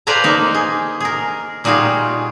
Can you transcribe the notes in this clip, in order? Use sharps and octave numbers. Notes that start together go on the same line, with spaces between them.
B4 C5 D5 F5 G#5 A#5
A#3 D#4
G#4
G#4 A#4
A#2 G3 D#4 F4 F#4 G#4